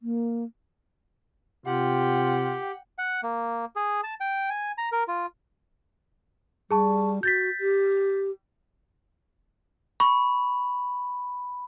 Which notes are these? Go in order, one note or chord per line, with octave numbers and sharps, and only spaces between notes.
A#3
C3 F4 G4 F#5 G5
F#5
A#3
G#4
A5
G5
G#5
A#5
A#4
F4
G3 G#4 A5 C#6
F#4 G6 A6 B6
G4
B5 C#6